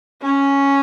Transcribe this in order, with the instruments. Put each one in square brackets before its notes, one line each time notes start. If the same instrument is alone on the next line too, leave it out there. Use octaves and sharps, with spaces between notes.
[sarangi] C#4